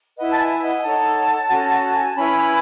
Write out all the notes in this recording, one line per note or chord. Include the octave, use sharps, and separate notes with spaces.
E4 B4 D#5 F#5
A5
E5 G#5
D#5 F#5
G#5
D#4 A4 C#5 F#5 A5
C#4 F#4 A4
F#5
G#5
A5
C#4 E4 B4 G#5 B5